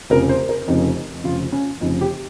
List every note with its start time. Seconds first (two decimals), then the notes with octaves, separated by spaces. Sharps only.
0.10 F1 F2 C#3 A#4
0.29 C5
0.49 A#4
0.68 F1 F2 C#3 D#4
1.24 F1 F2 C#3 F4
1.52 C#4
1.81 F1 F2 C#3 D#4
2.01 G4